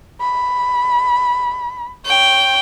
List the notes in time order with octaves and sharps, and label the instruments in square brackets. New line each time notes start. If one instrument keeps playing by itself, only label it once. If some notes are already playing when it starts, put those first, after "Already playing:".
[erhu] B5
[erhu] C#5 [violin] G5